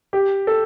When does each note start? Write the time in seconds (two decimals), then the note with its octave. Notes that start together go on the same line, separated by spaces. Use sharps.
0.13 G4
0.47 A4